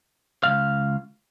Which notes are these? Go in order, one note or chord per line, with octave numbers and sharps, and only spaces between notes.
C#2 G#2 F5